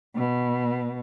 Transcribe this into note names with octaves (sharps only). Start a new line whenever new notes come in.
B2